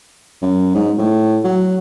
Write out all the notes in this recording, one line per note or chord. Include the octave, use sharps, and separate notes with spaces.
F#2
G#2
A2
F#3